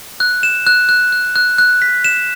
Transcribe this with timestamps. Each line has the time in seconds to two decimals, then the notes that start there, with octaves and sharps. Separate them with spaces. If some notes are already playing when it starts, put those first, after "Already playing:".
0.20 F#6
0.43 E7
0.67 F#6
0.89 F#6
1.12 F#6
1.36 F#6
1.58 F#6
1.82 B6
2.05 E7